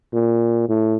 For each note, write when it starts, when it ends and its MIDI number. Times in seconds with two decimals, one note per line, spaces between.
0.13 0.65 46
0.69 0.98 45